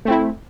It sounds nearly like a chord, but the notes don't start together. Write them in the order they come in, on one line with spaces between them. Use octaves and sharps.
A3 C4 E4